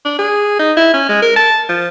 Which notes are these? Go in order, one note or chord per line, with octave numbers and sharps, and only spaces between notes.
D4
G#4
D#4
E4
C#4
G#3
A#4
A5
F3